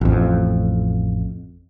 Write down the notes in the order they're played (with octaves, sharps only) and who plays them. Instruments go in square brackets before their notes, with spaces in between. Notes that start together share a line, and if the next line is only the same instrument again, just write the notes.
[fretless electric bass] A1 F2